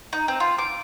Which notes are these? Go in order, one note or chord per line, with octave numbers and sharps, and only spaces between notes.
D#4
C4
F4
D6